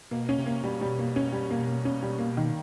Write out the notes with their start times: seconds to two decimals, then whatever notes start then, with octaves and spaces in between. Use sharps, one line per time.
0.11 B2 A#3
0.29 C#4
0.38 C3
0.46 A#3
0.64 B2 G3
0.81 G3
0.99 A#3
1.16 C#4
1.32 G3
1.51 A#3
1.67 A#3
1.85 C#4
2.02 G3
2.19 A#3
2.37 D#3